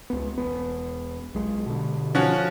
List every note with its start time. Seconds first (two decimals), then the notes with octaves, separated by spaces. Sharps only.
0.10 C#2 B3
0.38 E1 B3
1.34 B1 G#3
1.66 B2 D3
2.15 F3 C#4 F#4